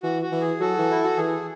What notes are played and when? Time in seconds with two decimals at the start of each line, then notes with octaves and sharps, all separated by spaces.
0.03 E3 F#4
0.22 F#4
0.32 E3
0.41 G#4
0.60 F#3 F#4 A4
0.78 E3
0.91 E4
1.04 F#4
1.17 E3 G#4